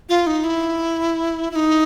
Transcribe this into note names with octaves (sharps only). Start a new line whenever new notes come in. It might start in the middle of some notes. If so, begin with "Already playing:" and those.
F4
D#4
E4
E4
D#4